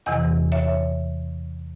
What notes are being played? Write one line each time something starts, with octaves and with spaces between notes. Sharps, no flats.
E2 C3 E3 D#5 F#5
C#5 E5